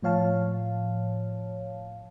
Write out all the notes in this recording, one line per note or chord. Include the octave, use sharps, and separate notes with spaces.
A2 F3 C#5 F5 A5